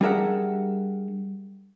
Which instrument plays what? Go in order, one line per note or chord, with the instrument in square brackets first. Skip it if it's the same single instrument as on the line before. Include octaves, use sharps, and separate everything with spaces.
[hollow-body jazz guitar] G3 D4 G#4 A#4 E5 F#5